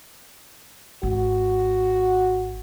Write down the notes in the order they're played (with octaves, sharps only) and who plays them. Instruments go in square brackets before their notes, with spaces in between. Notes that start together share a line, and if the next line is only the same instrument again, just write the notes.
[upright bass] G#1 [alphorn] F#4